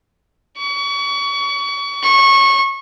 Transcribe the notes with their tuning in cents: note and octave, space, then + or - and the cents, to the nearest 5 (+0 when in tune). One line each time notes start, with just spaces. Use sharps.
C#6 +35
C#6 -20